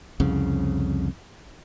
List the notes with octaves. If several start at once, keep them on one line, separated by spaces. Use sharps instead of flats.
C2 F2 C#3